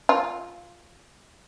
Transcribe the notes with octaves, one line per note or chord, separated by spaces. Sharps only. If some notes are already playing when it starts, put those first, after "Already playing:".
F4